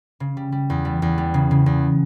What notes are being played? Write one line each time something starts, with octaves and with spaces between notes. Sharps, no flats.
C#3
G3
G3
E2
G3
E2
G3
C#3
C#3
E2